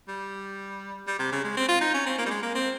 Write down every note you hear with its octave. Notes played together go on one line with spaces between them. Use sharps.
G3
G3
C3
C#3
G#3
C4
F4
D#4
C#4
C4
A#3
G3
G#3
A#3
C4